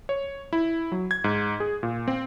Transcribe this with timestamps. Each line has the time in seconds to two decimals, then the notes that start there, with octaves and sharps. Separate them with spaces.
0.09 C#5
0.53 E4
0.92 F#3
1.11 G#6
1.24 G#2
1.60 G#4
1.83 A#2
2.08 C4